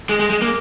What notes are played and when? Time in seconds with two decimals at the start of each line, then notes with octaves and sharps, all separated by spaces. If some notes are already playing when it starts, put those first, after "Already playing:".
0.09 G#3
0.19 G#3
0.30 G#3
0.42 A#3